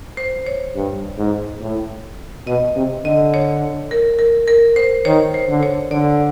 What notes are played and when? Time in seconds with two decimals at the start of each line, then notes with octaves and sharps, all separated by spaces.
0.17 C5
0.46 C#5
0.75 G2
1.18 G#2
1.61 A2
2.47 B2 D#5
2.75 C3
3.05 D3 D#5
3.34 C#5
3.91 A#4
4.19 A#4
4.48 A#4
4.76 C5
5.05 D#3 C#5
5.34 C5
5.48 D3
5.63 C#5
5.91 D3 D5